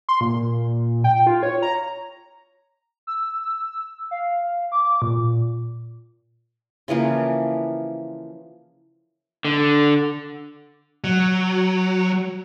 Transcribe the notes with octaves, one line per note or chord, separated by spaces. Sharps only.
C6
A#2
G5
F4
C#5
A#5
E6
F5
D6
A#2
C#3 E3 F3 A#3
D3
F#3